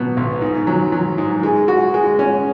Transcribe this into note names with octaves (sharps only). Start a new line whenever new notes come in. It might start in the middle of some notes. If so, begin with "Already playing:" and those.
Already playing: B2 F#3
B1
G#2
F#3
F#3
G#2
G#3
F#4
G#3
C#4